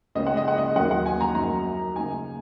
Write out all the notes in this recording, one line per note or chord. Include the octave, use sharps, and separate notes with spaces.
C#2 C#3 A#3 C#4 D#5
F#5
D#5
F#5
D#5
D#2 D#3 F#3 A#3 C#4 F#5
F#5
G#5
A#5
F#2 F#3 D#4 A#5
C#3 A#3 D#4 G#5